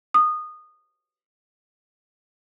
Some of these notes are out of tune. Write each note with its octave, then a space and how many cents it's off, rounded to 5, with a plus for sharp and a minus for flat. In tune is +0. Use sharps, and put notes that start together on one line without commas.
D#6 -20